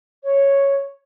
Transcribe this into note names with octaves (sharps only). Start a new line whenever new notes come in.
C#5